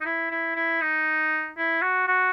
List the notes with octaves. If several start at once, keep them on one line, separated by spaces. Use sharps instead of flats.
D#4
E4
E4
E4
D#4
E4
F#4
F#4